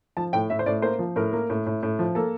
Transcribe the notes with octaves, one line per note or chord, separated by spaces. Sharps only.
F3 A5
A2 G5
A2 E5
C5
A2 D5
A#3 C5
F3
A2 A#4
A#3
A2
A2
A2
F3
A#3 A4